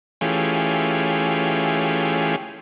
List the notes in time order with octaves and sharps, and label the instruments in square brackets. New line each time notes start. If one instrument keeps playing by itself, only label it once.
[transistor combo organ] E3 A3 C#4 F4 G4 G#4